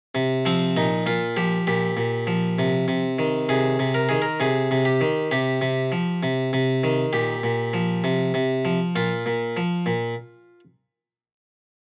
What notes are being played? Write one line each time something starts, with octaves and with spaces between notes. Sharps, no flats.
C3
F3 C4
A#2 D#4
A#2 F4
F3 G4
A#2 G4
A#2
F3
C3
C3
D#3
C3 G#4
C3
A#4
D#3 G#4
A#4
C3 G#4
C3
G4
D#3
C3 G4
C3
F3
C3
C3
D#3
A#2 G4
A#2
F3
C3
C3
F3
A#2 F4
A#2
F3
A#2